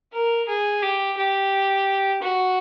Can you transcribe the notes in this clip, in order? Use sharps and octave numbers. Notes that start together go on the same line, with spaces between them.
A#4
G#4
G4
G4
F#4